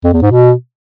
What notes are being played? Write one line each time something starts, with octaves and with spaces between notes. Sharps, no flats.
F2
E2
G#2
B2